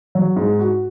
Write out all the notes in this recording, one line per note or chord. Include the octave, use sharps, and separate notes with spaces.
F#3
G#2
F#4